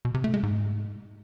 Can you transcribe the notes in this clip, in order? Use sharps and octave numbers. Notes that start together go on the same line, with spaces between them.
B2
C3
A3
G#3
G#2